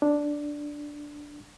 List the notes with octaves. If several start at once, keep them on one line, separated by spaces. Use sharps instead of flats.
D4